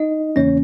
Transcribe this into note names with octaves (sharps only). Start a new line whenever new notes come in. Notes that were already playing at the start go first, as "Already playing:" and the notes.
Already playing: D#4 D#5
E2 C#3 E3 A#3 C#4 C#5